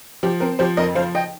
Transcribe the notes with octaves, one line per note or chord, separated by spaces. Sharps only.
F3 G4
C4 A#4
F3 G4 C5
F2 A#4 D#5
F3 C5 F5
D#5 G5